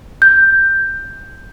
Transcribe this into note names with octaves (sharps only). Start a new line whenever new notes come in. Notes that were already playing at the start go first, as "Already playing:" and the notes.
G6